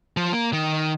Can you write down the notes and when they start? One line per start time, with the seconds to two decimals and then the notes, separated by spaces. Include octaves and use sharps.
0.17 F3
0.33 A#3
0.53 D#3